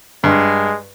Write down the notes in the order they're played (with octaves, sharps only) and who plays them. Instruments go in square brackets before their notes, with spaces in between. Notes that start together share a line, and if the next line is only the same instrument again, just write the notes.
[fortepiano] G2 [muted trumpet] G#3